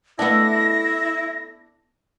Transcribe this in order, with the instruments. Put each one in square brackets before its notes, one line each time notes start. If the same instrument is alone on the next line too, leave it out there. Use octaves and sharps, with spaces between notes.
[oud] A3 D#5 F5 [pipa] B3 D4 [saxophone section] E4 [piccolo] A#6